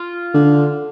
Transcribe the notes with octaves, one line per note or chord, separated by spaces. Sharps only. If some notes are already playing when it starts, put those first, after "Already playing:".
Already playing: F4
D3